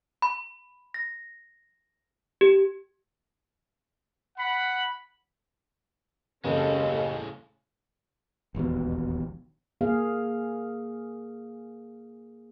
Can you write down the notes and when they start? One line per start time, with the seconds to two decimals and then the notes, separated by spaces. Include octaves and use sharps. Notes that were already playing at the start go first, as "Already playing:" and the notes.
0.22 B5
0.94 A#6
2.41 G4
4.37 F#5 B5
6.44 F#1 D#2 G#3 C4 C#4 A4
6.88 A2 C#3
8.55 E1 A#1 D#2 B2
9.81 A#3 G#4 F5